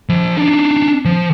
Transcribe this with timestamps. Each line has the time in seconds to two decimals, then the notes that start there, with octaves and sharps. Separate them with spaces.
0.09 F3 B5
0.37 D4 D#4
1.05 F3